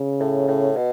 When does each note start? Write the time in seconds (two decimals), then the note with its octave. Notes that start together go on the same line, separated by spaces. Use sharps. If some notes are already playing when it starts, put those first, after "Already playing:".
Already playing: C#3
0.20 A2
0.48 A2
0.76 B2